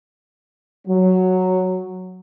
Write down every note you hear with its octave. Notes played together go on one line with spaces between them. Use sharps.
F#3